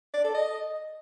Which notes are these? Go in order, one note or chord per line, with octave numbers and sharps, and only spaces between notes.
D5
A4
D#5